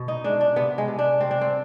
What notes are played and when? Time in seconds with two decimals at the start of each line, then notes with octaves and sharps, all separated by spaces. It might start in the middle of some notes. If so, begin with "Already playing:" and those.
Already playing: B2
0.08 D#4
0.24 G#3 D4
0.41 D4
0.56 C3 B3
0.78 G#3
0.88 C3
0.99 D4
1.20 G3 C4
1.31 D4
1.41 C4